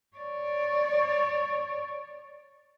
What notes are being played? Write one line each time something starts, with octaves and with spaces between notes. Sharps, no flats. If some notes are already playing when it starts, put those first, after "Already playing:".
C#5 D5